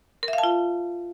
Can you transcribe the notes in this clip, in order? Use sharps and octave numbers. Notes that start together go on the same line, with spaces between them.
A#4
E5
F5
A5
F4